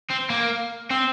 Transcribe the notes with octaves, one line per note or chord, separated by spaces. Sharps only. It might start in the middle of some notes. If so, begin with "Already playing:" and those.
C4
A#3
C4